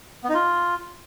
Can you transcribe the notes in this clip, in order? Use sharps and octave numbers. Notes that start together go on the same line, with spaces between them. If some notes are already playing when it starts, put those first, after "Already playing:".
B3
D#4
F4